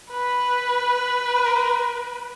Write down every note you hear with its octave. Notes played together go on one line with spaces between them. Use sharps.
B4